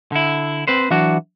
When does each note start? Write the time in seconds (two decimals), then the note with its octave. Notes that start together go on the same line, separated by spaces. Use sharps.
0.12 D3 E4
0.68 C4 B4 C5
0.91 E3 F#3 D4 F#4